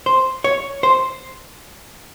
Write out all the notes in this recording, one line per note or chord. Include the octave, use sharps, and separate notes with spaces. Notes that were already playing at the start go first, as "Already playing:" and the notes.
C5
C#5
C5